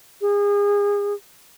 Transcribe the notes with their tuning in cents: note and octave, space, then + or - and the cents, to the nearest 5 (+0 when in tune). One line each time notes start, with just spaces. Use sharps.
G#4 -30